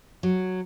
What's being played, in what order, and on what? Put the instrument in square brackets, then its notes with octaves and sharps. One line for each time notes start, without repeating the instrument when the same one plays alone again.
[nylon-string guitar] F#3